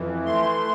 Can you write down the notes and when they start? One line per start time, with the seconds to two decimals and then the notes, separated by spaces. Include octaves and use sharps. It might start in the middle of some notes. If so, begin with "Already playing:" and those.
Already playing: F2 E3
0.25 A3 C6